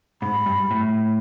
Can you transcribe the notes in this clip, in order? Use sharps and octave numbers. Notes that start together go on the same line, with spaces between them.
G#2 B5
G2
A2